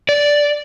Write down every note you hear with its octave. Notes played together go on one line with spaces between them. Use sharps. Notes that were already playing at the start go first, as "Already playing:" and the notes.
D5